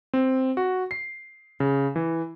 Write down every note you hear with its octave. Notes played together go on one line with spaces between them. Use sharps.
C4
F#4
C7
C#3
E3